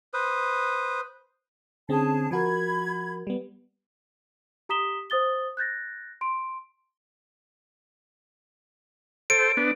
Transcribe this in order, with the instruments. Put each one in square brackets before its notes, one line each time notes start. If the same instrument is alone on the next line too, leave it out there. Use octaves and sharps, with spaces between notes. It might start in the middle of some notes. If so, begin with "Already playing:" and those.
[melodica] B4 C5 D#6
[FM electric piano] D3 C4 C#4 [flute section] G#4 A5
[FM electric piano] F3 F#4 A#4 [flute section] B5 G#6
[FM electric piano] G3 B3
[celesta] G4 A#5 D#6 B6 E7 G7
C5 D#6 A6 G7
F#6 G6 A6 A#6
C6 D7
[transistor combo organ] A4 C5 [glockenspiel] D7
[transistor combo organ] B3 D4